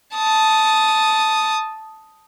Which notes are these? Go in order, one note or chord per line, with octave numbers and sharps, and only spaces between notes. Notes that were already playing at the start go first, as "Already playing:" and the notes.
A5 D#6